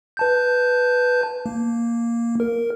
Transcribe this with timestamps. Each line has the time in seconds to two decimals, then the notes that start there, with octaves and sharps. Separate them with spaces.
0.17 B4 A5 G6
1.46 A#3
2.40 A#4